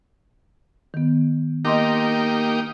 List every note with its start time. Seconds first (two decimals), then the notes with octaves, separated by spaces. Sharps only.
0.94 D#3 B3
1.65 A#3 D#4 G4 D#5 C6 D6